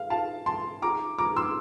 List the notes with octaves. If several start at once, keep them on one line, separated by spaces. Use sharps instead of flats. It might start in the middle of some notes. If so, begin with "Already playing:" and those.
Already playing: F5
F5 A5
A5 C6
A#5 D6
A#5 D6
C6 E6